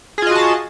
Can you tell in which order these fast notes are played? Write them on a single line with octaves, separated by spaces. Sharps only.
G#4 F4 D#5 F#4 A5